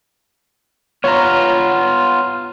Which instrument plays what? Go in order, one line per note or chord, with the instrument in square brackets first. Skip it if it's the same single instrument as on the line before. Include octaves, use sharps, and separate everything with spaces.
[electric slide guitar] B3 F4 [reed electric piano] C#5 A#5